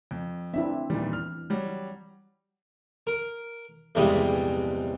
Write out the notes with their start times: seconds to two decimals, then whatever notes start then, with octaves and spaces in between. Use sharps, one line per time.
0.11 F2
0.54 C4 D4 E4 E5
0.90 A#2 D#3 E3 G3
1.13 F6
1.50 F#3 G3
3.07 A#4
3.95 A#1 E2 G2 C3 G3 G#3